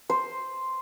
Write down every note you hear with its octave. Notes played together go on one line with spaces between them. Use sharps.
C5